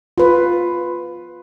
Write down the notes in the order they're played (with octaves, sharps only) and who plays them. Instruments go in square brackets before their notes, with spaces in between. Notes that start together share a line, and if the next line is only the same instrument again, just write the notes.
[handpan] F4 B4